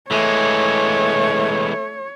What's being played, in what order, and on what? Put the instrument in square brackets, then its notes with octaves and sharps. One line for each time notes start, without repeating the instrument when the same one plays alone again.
[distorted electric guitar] E3 G#3 [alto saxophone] A3 [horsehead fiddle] C#5